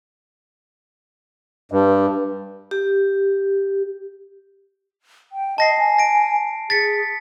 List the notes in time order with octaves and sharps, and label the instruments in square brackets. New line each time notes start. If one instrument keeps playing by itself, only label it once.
[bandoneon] G2
[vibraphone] G4
[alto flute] G5
[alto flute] D#5 [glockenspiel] A5 A#6 C7
[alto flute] G#5
[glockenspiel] A#6 D7
[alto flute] G#4 [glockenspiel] A6 B6 C#7